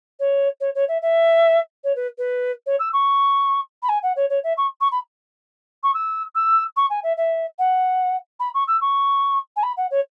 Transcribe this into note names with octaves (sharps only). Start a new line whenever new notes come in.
C#5
C#5
C#5
E5
E5
C#5
B4
B4
C#5
E6
C#6
B5
G#5
F#5
C#5
C#5
E5
C#6
C#6
B5
C#6
E6
E6
C#6
G#5
E5
E5
F#5
B5
C#6
E6
C#6
G#5
B5
F#5
C#5